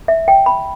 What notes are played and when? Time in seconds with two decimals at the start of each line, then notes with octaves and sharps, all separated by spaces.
0.08 E5
0.28 G5
0.46 B5